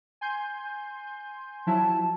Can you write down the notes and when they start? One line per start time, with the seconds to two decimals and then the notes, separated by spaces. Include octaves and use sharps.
0.21 G#5 C6 G6
1.67 F3 F#3 E4 A5